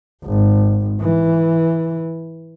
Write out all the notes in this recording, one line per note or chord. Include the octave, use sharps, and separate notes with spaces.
G#1
E3